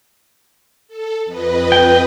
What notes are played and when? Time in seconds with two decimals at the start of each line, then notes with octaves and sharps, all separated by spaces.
0.88 A4
1.25 F2 B4 D#5
1.72 G5